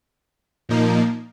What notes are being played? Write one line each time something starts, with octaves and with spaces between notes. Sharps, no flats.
A#2 F3 A#3 D#4